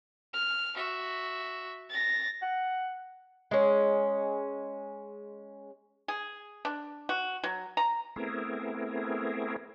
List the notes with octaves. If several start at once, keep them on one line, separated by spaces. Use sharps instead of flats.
F6
F#4 E5
A6 A#6
F#5
G#3 C#4
G#4
D4
F#4
F#3
A#5
A3 B3 C4 E4 G#4 A#4